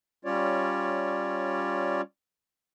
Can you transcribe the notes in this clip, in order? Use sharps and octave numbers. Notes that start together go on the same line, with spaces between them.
G3 C#4 F4 C#5 D5